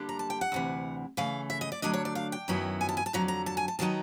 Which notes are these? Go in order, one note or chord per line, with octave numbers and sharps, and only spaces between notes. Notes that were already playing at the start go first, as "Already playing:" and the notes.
Already playing: D3 G3 A#3 D4
A#5
A5
G5
F#5
D2 C3 E3
C#3 E3 A3 F5
E5
D#5
D5
D3 F#3 A3 D4 D#5
C#5
D5
F5
G5
F#2 D#3 F#3 B3 E4
G#5
A5
G#5
A5
F2 D3 F#3 A#5
A#5
A5
G#5
A5
D#3 F#3 B3 D#4 A5